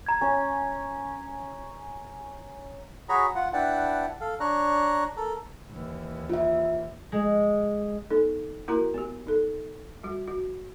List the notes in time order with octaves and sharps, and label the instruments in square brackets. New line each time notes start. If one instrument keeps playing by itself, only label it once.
[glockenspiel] A#5 G#6
[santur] C#4
[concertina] F#4 G#4 C#5 A#5 B5
F4 F#5
D4 E4 B4 F#5 G5 A5
A4 F5
D4 C#5 A#5 F#6
A4 A#4
[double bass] D#2 E3
[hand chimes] F4 E5
[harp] G#3
[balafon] B3 D#4 A4
A#3 E4 F#4 A#4 A#5
B3 G4
D#4 A4
G3 F#4
F#4